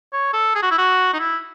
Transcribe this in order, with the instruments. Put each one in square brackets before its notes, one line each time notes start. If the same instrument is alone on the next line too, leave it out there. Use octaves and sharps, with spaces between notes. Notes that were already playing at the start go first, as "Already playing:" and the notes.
[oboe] C#5
A4
G#4
F#4
E4
F#4
D#4
E4